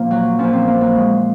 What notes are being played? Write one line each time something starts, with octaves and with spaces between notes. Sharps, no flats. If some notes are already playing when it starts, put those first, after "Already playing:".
Already playing: A#2 F3 A#3 A#4
F#3
A#2 F3 C#4
C4
A#3
F#3
G#3